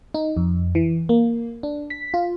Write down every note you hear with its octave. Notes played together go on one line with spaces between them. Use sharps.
D#4
F2
E3
A#3
D4
B6
F4